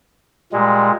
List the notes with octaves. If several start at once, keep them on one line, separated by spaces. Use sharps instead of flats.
A#2 G3 G#3